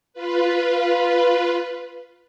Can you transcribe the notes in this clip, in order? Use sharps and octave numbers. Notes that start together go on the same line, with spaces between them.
F4 B4